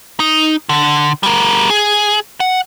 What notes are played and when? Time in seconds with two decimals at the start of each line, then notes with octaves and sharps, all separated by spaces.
0.20 D#4
0.69 D3
1.23 G3 A#4
1.70 G#4
2.40 F#5